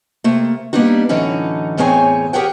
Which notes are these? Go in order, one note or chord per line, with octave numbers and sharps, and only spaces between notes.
C3 A3 A#3
G3 A#3 B3 D4 D#4 F#4
A2 D3 E3 F#3 C#4 D#4
E2 A2 C4 G#4 C#5 G#5
G4 G#4 A#4 C#5 F#5 G5